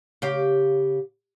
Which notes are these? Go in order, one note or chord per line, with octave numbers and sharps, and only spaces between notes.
C#3 G4 F5